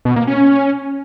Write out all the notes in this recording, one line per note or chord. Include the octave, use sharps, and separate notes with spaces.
B2
A#3
C#4